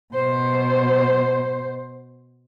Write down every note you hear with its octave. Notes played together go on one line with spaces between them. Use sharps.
B2 C5